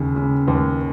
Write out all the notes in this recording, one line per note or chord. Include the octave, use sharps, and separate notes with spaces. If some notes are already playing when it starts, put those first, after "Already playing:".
Already playing: D#2 C#3
C#3
D#2